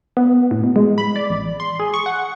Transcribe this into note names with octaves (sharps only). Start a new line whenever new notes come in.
B3
A2
B2
G#3
B5
D5
A1
C6
G#4
C#6
F#5